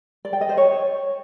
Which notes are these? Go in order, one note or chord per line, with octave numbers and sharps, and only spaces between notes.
D5
G5
D#5
C5
C#5